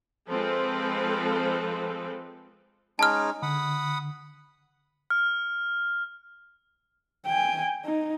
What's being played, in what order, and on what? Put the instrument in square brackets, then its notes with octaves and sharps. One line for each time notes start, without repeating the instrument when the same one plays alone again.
[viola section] F3 G#3 C4 A4 B4
[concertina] G#3 C#4 D#4 [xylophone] A5 F6
[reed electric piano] D3 [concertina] F#5 B5 D#6
[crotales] F6
[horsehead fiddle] G5 G#5
D#4